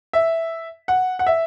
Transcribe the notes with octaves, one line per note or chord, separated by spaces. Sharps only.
E5
F#5
F#5
E5